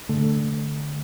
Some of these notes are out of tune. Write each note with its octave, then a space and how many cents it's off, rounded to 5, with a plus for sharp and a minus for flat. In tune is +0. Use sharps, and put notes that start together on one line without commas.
D3 +0 A3 +0